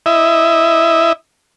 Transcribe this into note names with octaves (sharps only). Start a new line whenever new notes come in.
E4 D#5 E5